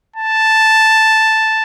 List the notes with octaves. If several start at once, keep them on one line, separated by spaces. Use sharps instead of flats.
A5